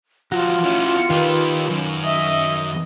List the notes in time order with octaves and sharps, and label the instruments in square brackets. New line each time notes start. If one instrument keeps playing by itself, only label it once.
[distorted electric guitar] F3 F#3 [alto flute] F4 [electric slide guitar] F#4
[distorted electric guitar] C#4 E4
[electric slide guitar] D#3 F5 [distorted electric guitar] D#4 G4 [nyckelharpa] B4
[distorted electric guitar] F#2
[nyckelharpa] D#5 [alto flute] E5